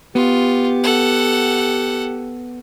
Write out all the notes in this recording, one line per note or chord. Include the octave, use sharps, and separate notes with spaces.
B3 F4 G4
A4 F#5